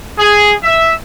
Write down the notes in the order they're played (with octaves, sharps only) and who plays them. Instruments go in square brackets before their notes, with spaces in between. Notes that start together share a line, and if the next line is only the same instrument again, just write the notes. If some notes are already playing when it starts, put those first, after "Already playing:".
[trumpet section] G#4
E5